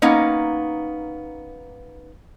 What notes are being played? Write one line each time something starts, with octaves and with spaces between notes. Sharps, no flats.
A#3 B3 C#4 D#4